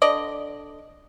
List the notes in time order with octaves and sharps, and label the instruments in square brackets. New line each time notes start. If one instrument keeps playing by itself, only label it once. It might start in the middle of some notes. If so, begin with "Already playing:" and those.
[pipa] D3 D5 D#5